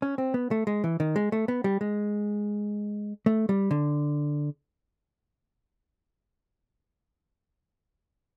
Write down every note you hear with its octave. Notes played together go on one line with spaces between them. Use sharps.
C#4
C4
B3
A3
G#3
E3
D#3
G#3
A3
B3
G3
G#3
A3
G3
D3